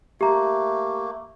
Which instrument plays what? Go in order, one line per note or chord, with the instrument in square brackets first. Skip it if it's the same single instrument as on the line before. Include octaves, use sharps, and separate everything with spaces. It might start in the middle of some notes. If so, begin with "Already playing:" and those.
[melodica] A3 A#3 [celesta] G4 A#5